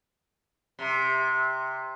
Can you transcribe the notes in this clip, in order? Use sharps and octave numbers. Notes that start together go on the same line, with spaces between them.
C3